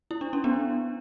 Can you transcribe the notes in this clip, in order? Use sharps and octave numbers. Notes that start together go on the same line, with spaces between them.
E4
D4
C#4
B3 D4